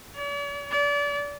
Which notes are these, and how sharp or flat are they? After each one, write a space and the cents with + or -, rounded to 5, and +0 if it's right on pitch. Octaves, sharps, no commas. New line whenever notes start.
D5 -45
D5 -30